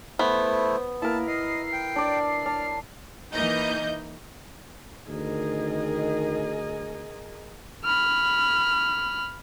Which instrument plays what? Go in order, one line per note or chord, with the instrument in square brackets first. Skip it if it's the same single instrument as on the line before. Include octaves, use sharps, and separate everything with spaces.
[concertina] A3 E4 [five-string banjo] B3 [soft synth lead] C5
[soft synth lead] A#3 [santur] E4 A#4 [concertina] A5
[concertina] D#5 [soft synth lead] C7
[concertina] G5
[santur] D4 D5
[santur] D4 [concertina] F6
[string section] E3 A#3 D#4 D#5 G6
[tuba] D2 [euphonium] D#3 [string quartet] G#4 A#4 D#5
[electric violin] B5 F6